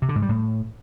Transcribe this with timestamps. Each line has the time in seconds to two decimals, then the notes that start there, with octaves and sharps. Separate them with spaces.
0.02 C3
0.09 D3
0.16 G#2
0.22 G3
0.29 A2